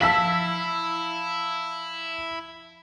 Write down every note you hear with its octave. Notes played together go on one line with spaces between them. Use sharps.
F3 E4 F5 A5 E6 B6 F#7